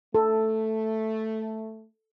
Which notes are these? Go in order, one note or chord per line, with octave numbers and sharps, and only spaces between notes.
A3 A4